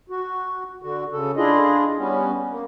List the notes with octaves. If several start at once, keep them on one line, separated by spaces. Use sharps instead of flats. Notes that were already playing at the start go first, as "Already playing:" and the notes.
F#4
D3 F#4
C#3 A4
D4 E4 F4 G#4 D#5
G3 B3 C#4
A#3